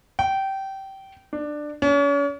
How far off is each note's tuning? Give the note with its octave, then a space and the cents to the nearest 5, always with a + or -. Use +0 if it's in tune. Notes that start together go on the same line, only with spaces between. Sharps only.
G5 -20
D4 +15
C#4 +40